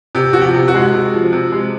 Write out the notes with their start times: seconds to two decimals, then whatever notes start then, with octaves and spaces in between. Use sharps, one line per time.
0.15 C3 G4
0.33 F3 F#4
0.42 G4
0.55 C3
0.68 F#4
0.75 G#3
0.94 C3
1.14 F3
1.33 C3
1.52 G#3